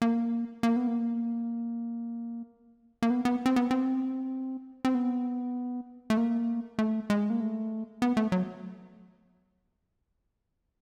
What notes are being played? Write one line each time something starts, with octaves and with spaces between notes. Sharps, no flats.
A#3
A#3
B3
A#3
A#3
B3
B3
C4
B3
C4
C4
B3
A3
A#3
A3
G#3
A#3
A3
B3
A3
F#3